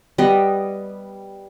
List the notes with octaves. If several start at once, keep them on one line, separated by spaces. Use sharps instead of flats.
G3 B3 D#5